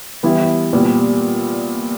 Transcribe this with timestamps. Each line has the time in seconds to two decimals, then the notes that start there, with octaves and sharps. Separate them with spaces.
0.23 E3 G3 B3 E4
0.73 A#2 G3 B3